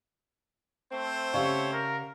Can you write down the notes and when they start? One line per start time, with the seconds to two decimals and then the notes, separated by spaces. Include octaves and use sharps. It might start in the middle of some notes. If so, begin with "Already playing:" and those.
0.91 A3 C4 C5
1.34 C#3 G4 C#5 D5 F5 F#5 C#6
1.73 A#4